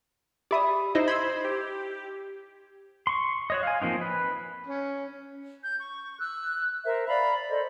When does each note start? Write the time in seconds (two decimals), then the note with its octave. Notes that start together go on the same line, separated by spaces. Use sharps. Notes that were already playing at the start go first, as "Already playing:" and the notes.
0.51 G4 D5 E5 B5 D#6
0.95 D#4 E4 C5 D#5
1.08 B5 C6 E6 G#6
1.45 G4
3.07 C6 C#6
3.50 F#4 C#5 D#5
3.63 F5 G#5
3.81 F3 A#3 C4 D#4
4.01 B4
4.67 C#4
5.63 G6
5.80 C#6
6.20 E6 F#6
6.85 A#4 C5 E5
7.08 D5 F5 A#5 B5
7.50 A4 C5 D5 D#5